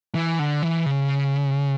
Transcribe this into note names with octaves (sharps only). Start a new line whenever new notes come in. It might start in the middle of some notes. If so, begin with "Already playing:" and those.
E3
D3
E3
C#3